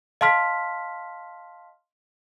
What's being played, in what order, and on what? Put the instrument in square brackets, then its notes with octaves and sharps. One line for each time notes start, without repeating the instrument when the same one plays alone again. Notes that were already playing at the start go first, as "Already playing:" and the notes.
[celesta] D#5 F5 A5 C6 F6 B6